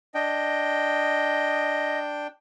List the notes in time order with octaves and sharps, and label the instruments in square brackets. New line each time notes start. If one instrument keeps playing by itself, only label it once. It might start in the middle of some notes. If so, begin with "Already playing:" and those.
[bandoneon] D4 G5 [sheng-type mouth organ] D#5